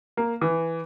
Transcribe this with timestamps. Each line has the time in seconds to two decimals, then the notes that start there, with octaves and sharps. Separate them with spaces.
0.17 A#3
0.41 E3